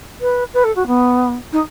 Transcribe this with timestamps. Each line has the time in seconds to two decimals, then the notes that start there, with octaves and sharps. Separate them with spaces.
0.21 B4
0.54 B4
0.64 A4
0.76 F#4
0.87 B3
1.52 D#4